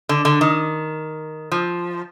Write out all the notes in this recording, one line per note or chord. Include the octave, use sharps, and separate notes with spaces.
D3
D3
D#3
F3